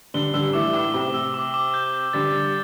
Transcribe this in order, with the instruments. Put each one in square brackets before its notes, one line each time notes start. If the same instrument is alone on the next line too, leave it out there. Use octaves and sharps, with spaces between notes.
[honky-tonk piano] D3 G3 [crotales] G7
[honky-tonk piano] D3 G3 [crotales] E6
[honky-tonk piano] E3 A3 [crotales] D6
[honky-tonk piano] A2 [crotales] D6
[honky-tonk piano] C3 [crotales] G7
[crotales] E6
D6
D6
G6
G6
[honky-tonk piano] D3 G3 [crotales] A6
[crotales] A6